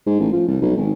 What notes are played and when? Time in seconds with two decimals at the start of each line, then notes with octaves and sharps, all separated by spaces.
0.07 G#2
0.20 A1
0.32 F3
0.48 C2
0.62 B1
0.77 G#1